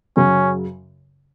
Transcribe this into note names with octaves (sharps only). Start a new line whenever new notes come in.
F#2 C#3 F#3 C#4